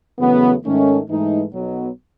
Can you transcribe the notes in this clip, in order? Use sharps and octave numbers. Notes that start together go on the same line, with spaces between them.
E2 C#3 F#3 A3 B3
G#2 D#3 A3 C#4
G#2 E3 A3 D#4
B1 B2 F#3 B3